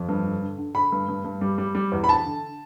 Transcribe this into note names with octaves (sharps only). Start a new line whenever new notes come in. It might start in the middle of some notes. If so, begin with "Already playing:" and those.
Already playing: F2
G2
D3
D3
D3
D3 B5
G2
G2
G2
G3
G3
G3
E2
B5
D3 A5
D3